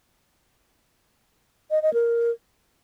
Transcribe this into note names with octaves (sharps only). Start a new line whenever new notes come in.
D#5
D#5
A#4